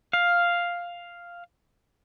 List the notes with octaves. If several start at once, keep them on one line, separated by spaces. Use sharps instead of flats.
F5